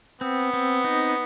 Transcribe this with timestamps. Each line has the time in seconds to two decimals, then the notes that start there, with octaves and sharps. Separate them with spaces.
0.21 B3 C4
0.53 C4
0.84 D#4